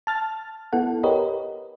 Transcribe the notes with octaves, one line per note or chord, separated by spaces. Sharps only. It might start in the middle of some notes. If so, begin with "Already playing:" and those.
A5 F6 A6
B3 E4 A4 F#5
G4 A#4 B4 C#5 D#5